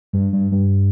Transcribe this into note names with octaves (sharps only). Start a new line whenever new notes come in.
G2
G2
G2